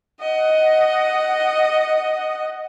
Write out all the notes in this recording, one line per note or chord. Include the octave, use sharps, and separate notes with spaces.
D#5 F#5